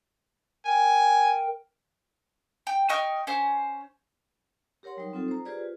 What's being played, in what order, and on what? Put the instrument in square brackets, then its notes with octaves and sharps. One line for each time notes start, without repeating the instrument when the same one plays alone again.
[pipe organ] A#4 G5 [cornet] G#5
[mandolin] G5
D#5 G5 C#6 F6
C#4 C5
[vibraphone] G4 A#4 C#5 F#5 C6
F#3 G3 D#4 F#5
C4 D#4 F4 A4
C5 A#5
F4 G4 G#4 B4 C5 D5
F4